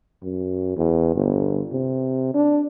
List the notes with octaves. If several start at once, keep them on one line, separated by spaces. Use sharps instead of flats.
F#2
E2
G1
C3
D4